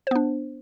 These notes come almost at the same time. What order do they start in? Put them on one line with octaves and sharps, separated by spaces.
C5 B3 D4